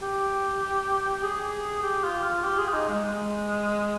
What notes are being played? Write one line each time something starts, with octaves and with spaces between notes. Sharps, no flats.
G4
G#4
G4
F4
F4
G4
G#4
F4
D#4
G#3
G#3